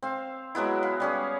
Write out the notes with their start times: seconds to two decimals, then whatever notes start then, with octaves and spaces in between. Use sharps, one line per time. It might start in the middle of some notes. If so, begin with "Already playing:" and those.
0.03 C4 F5
0.55 F#3 G#3 B3 E4
0.83 F5
1.00 G3 C#4 G#4